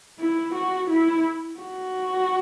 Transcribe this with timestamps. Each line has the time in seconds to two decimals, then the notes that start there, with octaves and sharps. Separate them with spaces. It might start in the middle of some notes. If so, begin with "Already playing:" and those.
0.19 E4
0.54 F#4
0.90 E4
1.60 F#4